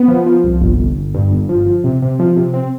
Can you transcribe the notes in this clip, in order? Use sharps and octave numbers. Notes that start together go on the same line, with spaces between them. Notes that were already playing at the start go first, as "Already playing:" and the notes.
Already playing: B3
F3
F3
C2
G1
G1
G1
G2
G1
F3
F3
C3
C3
F3
C3
C4